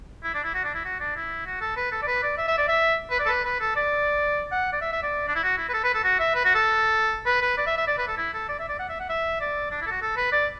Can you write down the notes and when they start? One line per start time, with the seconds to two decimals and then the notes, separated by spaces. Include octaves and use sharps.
0.24 E4
0.34 D4
0.44 E4
0.54 F#4
0.64 D4
0.75 E4
0.85 F#4
1.00 D4
1.16 E4
1.46 F#4
1.61 A4
1.77 B4
1.92 A4
2.02 D5
2.07 B4
2.23 D5
2.38 E5
2.48 E5
2.58 D5
2.68 E5
3.10 B4
3.19 D5
3.25 A4
3.29 B4
3.45 B4
3.60 A4
3.76 D5
4.52 F#5
4.73 D5
4.81 E5
4.93 E5
5.03 D5
5.28 D4
5.35 E4
5.44 F#4
5.58 E4
5.69 B4
5.74 A4
5.84 B4
5.94 A4
6.04 F#4
6.19 E5
6.35 B4
6.45 F#4
6.55 A4
7.26 B4
7.42 B4
7.58 D5
7.67 E5
7.77 E5
7.87 D5
7.98 B4
8.08 A4
8.17 E4
8.34 A4
8.49 D5
8.59 E5
8.69 D5
8.79 F#5
8.89 E5
8.99 F#5
9.09 E5
9.40 D5
9.71 D4
9.81 E4
9.87 A4
9.91 F#4
10.02 A4
10.17 B4
10.32 D5